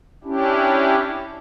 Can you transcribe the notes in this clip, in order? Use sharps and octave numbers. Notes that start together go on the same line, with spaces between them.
C#4 D4 E4 G4